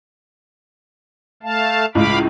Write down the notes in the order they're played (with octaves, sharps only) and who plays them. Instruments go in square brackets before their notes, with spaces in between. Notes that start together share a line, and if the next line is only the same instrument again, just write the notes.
[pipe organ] A3 F5 A5
[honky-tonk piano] C#2 A2 G#3 [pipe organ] F5 B5 D6